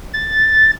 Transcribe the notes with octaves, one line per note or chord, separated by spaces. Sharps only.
A6